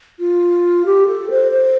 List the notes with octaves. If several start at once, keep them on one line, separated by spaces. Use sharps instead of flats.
F4
G4
A4
C5
C5